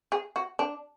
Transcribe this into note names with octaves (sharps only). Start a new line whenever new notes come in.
G#4
F#4
D4